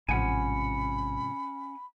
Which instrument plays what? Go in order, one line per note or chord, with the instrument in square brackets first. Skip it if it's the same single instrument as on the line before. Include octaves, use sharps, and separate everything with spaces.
[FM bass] A1 [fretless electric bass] G#2 C3 F3 [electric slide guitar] C#4 F#5 G#5 [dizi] B5